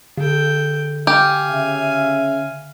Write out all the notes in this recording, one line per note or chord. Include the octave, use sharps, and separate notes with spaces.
D3 A4 G5
G4 F5 G#5
C#3 E5